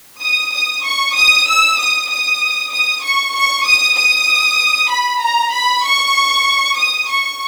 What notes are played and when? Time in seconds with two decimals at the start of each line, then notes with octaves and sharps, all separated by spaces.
0.21 D#6
0.53 D#6
0.84 C#6
1.15 D#6
1.48 E6
1.78 D#6
2.10 D#6
2.72 D#6
3.03 C#6
3.35 C#6
3.66 D#6
3.96 D#6
4.90 B5
5.21 A#5
5.52 B5
5.85 C#6
6.78 D#6
7.10 C#6